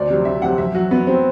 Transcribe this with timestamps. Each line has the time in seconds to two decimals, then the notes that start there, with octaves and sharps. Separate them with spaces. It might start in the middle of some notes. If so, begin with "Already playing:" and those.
Already playing: D2 D5
0.09 C3 F#3
0.25 D2 E5
0.42 C3 F#3 F#5
0.58 F#2 E5
0.74 F#3 F#4
0.91 F#2 B3
1.07 F#3 C4